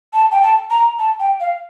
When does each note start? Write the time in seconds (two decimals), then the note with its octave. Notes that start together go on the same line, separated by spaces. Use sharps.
0.13 A5
0.32 G5
0.42 A5
0.70 A#5
0.99 A5
1.20 G5
1.40 F5